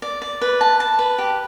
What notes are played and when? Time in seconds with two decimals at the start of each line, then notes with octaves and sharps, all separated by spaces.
0.02 D5
0.22 D5
0.41 B4
0.61 A5
0.80 A5
0.99 B4
1.18 G4